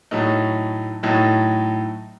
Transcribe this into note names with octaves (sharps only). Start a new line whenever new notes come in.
A2 F#3 A3 D#4
A2 F#3 A3 D#4